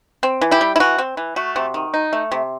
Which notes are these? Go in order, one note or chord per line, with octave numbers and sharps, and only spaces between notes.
C4
E3
E4 G4
G3
E4
E3 F#4
C4
E3
A3 F#4
C3
D#3
D#4
A3
C3